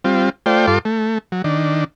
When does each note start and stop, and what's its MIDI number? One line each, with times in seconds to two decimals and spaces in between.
0.04 0.30 55
0.04 0.30 60
0.04 0.30 65
0.46 0.66 57
0.46 0.66 65
0.46 0.66 72
0.46 0.66 74
0.46 0.66 79
0.67 0.79 43
0.67 0.79 65
0.67 0.79 69
0.67 0.79 84
0.67 0.79 86
0.85 1.18 57
1.32 1.42 54
1.44 1.84 51
1.44 1.84 62